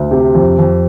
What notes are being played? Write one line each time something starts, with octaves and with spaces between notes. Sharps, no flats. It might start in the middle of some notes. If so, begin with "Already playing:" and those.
Already playing: D2
C3 G4
F2
F2